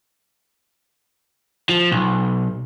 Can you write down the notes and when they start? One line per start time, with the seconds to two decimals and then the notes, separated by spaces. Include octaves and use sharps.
1.69 F3
1.92 B1